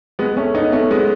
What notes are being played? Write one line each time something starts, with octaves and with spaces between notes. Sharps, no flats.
G#3 B3
A3 C#4
B3 D#4
A3 C#4
G#3 B3